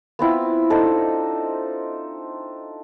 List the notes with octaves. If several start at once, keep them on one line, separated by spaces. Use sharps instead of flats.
B3 C4 E4 F4
D4 D#4 A4 C5